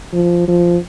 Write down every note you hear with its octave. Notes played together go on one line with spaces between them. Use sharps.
F3
F3